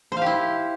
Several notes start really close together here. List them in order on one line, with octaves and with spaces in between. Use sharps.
C5 F5 G4 E4